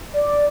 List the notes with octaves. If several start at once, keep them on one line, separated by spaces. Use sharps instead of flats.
D5